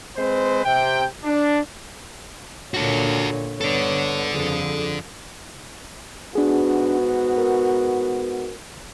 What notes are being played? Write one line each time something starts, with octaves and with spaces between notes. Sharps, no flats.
G#3 C4 B4 C5
C3 G5
D4
A#2 D3 F#4 A4 C#5
G2 B3 A4 C#5 D5
F2 F3 G#4
G#2 B3 D4 F#4 G#4
A#4